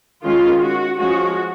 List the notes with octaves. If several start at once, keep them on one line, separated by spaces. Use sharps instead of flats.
D#3 G#3 C#4 F4
F#4
F3 G#3 C#4 F#4